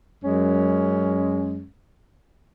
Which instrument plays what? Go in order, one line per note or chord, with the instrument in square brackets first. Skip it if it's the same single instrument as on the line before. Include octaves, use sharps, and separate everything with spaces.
[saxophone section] F#2 G#3 C#4